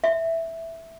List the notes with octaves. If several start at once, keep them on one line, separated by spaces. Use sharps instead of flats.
E5